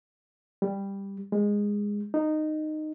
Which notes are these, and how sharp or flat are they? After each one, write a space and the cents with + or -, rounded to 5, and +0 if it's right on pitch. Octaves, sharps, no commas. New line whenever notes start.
G3 +10
G#3 -15
D#4 -15